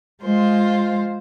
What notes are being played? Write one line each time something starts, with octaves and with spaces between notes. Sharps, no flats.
G#3 F4 C5